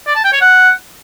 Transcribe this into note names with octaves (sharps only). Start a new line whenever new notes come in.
D5
A5
G5
C#5
F#5